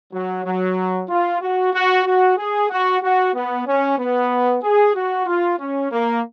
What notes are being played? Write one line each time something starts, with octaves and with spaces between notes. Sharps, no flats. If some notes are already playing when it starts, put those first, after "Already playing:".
F#3
F#3
F4
F#4
F#4
F#4
G#4
F#4
F#4
B3
C#4
B3
G#4
F#4
F4
C#4
A#3